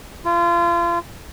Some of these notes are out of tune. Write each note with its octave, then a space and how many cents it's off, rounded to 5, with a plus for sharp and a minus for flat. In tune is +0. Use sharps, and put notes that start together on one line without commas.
F4 -30